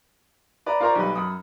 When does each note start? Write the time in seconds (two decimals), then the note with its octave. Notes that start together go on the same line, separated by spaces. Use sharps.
0.66 B4 D5 A#5
0.81 F4 A#4 C5 D5 A#5 C#6
0.95 B1 G3 B4
1.15 F#2 B5 D#6